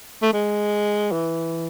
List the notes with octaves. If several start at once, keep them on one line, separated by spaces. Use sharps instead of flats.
A3
G#3
E3